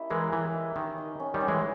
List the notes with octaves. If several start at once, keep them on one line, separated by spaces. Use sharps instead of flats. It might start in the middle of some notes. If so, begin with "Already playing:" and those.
Already playing: A#3 C#4 E4 G4 D#5
E3 G#3 A#4
E3 B4
D#5
D#3 D#5
D#5
C#4
D#3 G3
C#4
E3 G#3